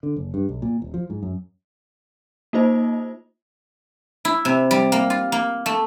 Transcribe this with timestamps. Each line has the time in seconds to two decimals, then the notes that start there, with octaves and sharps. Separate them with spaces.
0.03 D3
0.16 F#1
0.34 G2
0.49 B1
0.62 A#2
0.82 D#1
0.94 F3
1.10 G#2
1.23 F#2
2.53 A#3 D#4 F4 C5 D#5
4.25 E4
4.45 C3
4.71 G3
4.92 A#3
5.10 F4
5.32 A#3
5.66 A3